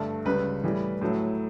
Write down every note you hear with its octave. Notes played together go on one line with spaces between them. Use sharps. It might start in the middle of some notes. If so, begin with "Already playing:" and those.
Already playing: G2 D3 A3
C#2 C#3 G3 B4
A2 E3 G3
A2 F#3 A3